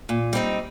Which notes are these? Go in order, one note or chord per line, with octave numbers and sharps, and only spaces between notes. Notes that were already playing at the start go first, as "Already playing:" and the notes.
A#2
G3 C4 D#4